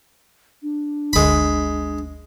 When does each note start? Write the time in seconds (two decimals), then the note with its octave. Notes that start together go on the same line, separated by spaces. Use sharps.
0.63 D4
1.13 G1 D2 G#3 B5